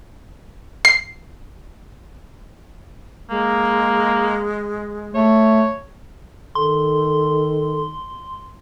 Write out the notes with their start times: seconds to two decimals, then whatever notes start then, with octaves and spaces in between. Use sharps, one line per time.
0.85 C7
3.30 G#3 A#3
5.15 A3 C#5
6.55 D#3 A4 C6